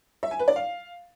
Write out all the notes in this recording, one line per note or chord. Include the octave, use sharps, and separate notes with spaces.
E5
G#5
B4
D5
F5